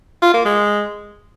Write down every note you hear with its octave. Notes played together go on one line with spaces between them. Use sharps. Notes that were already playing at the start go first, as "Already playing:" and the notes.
F4
A#3
G#3